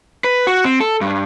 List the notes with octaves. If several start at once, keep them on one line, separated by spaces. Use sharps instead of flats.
B4
F#4
C4
A4
G2